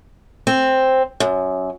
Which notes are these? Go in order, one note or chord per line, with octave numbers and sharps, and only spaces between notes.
C4
F#2